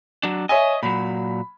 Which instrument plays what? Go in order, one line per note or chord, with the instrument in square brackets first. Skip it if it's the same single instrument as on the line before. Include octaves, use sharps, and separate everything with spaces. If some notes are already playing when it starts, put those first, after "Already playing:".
[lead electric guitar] F#3 D4
[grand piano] C#5 E5 G#5 [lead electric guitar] D#5
[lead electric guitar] A#2 F#3 [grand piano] B5